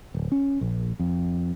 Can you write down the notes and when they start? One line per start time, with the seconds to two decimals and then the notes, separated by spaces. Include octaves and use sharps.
0.15 D1
0.32 C#4
0.61 A#1
0.99 F2